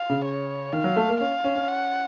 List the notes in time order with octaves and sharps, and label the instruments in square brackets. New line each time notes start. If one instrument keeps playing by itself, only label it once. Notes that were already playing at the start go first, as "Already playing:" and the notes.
Already playing: [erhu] F5
[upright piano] C#3
[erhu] C#5
[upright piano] D#3 [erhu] F5
[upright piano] F#3
A3
A#3
[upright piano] C#4 [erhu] F5
[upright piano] C#4
C#4
[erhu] F#5